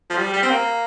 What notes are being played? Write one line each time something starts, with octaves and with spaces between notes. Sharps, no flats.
F3
G3
G3
C4
A#3